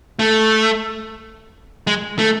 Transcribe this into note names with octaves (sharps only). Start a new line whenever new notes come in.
A3
G#3
A3